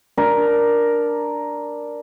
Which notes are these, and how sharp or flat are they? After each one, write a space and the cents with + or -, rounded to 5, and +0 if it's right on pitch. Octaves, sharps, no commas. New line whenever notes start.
D4 +0 A#4 +5